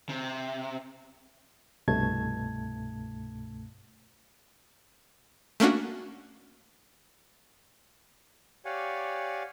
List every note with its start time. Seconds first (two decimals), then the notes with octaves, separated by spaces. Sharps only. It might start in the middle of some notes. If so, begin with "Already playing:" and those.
0.09 C3
1.88 C2 G2 B2 A3 A5 G#6
5.60 A3 A#3 C#4 D4 F#4
8.65 G4 C#5 D5 F5 F#5 G#5